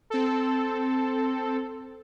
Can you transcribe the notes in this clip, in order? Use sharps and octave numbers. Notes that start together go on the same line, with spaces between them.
C4 A4